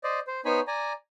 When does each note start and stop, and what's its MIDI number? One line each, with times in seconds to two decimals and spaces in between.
0.04 0.19 72
0.04 0.19 74
0.04 0.19 75
0.27 0.41 72
0.45 0.60 59
0.45 0.60 63
0.45 0.60 72
0.45 0.60 73
0.45 0.60 80
0.45 0.60 83
0.67 0.93 74
0.67 0.93 80
0.67 0.93 82